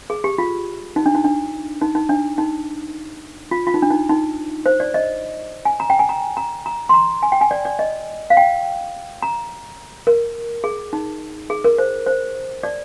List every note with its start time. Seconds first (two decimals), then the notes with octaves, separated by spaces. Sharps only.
0.10 G#4
0.24 G4
0.38 F4
0.96 D#4
1.06 D4
1.15 D#4
1.24 D4
1.81 D#4
1.95 D#4
2.09 D4
2.38 D#4
3.51 F4
3.67 F4
3.74 D#4
3.82 D4
3.91 D#4
4.09 D#4
4.66 C5
4.80 D5
4.94 D#5
5.65 G#5
5.80 A#5
5.90 G5
5.99 G#5
6.09 A#5
6.37 A#5
6.66 A#5
6.89 C6
6.94 A#5
7.23 G#5
7.32 G5
7.41 G#5
7.51 D5
7.65 D5
7.79 D#5
8.30 F5
8.37 G5
9.22 A#5
10.07 A#4
10.64 G#4
10.93 D#4
11.50 G#4
11.64 A#4
11.78 C5
12.07 C5
12.63 D5